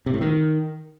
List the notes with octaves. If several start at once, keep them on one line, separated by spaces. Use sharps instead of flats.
C3
A2
D#3